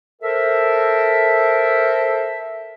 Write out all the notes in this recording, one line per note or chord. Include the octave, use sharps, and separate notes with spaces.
A4 A#4 C5 E5